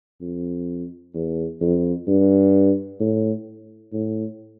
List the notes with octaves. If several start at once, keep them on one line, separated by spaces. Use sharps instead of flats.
F2
E2
F2
G2
A2
A2